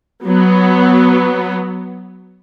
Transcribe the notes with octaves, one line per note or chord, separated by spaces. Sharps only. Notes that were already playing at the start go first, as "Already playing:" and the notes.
F#3 B3